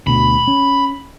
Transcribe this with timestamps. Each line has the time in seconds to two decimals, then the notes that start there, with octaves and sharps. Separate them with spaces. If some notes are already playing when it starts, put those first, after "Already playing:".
0.07 D2 B2 B5
0.48 C#4